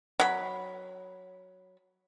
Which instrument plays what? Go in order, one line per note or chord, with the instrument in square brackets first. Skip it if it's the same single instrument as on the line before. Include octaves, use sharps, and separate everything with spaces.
[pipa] F#3 B5